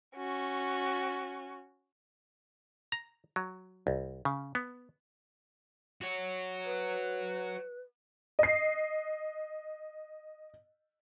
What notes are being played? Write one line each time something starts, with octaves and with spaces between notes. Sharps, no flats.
C#4 F#4
A#5
F#3
C2
C#3
B3
F#4 C#5
B4
D#5 C7